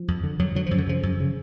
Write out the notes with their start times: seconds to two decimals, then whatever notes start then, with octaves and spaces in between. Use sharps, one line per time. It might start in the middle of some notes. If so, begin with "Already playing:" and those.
Already playing: F3
0.08 F2
0.24 D3
0.39 F2 F#3
0.55 D3 F#3
0.66 F#2 F3
0.78 D3
0.87 C#3 F3
1.03 F#2
1.20 C#3